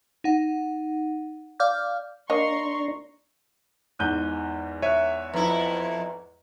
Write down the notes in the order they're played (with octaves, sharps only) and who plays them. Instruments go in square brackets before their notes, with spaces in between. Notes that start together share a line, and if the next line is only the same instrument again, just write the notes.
[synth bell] D#4 F#5
D5 F5 D6 F6 G6
[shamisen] A#3 C#5 D#5 [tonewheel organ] D4 [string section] A#5 C6 C#6
[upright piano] E2 G#2 G6 [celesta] F#6 D#7 G7
[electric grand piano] C#5 E5 [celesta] F#6 D#7
[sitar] F2 E4 [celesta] B4 A#5